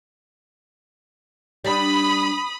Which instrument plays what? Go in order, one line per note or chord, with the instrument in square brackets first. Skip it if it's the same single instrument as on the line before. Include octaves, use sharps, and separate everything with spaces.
[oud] G3 D4 [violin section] B5 D#6